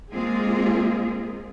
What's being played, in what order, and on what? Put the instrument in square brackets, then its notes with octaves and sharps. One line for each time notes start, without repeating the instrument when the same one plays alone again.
[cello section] G#3 A#3 C4 F4 G#4